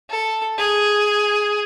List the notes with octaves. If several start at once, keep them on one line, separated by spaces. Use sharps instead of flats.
A4
G#4